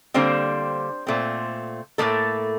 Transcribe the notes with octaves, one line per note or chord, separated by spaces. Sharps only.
D3 G3 A#3 C4 C5
A#2 A3 C4
A2 F3 A3 A#3 A4